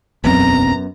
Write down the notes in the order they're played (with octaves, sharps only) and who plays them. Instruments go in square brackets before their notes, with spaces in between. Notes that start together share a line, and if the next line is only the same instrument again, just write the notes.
[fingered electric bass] E1 B1 C4 [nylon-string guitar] F#2 B3 [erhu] A#5